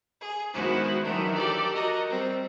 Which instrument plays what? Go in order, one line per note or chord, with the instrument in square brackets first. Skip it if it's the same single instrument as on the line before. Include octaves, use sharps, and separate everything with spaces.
[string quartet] G#4
D#3 G#3 B3 E4 F#4 C5
D#3 E3 F#3 D4 A#4
G4 A4 A#4 D5
F#4 A#4 D#5
G3 C4